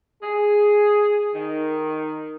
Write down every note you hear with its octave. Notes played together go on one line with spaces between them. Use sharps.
G#4
D#3